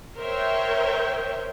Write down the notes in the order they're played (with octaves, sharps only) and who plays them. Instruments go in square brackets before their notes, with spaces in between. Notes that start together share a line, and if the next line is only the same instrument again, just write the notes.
[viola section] A#4 C5 C#5 E5 G5